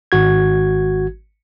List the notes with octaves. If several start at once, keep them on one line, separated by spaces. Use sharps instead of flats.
G#1 F#4 G#6